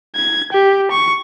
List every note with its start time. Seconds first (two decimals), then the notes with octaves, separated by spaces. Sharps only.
0.16 G#6
0.53 G4
0.92 C#6